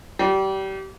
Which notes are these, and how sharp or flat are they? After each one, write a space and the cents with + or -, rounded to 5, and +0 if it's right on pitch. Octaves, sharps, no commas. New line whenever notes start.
G3 -25